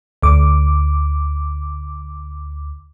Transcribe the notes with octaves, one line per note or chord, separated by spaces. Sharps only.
D2 D6